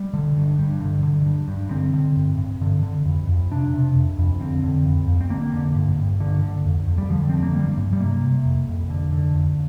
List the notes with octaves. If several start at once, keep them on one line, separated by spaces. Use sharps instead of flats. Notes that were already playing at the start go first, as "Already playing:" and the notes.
Already playing: G3
D3
G2
G2
D3
D3
G2
G2
D3 C4
D3
G2
G2
D3
D3
F2
F2
C3 D4
C3
F2
F2
D3 C4
D3
F2
F2
C4
D3 A#3
D3
G2
G2
D3
D3
F2
F2
G3
D3 F3
D3 C4
A#3
G2 G3
G2
G3
C3 A#3
C3
F2
F2
D3
D3
F2